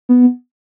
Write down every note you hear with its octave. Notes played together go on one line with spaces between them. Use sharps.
B3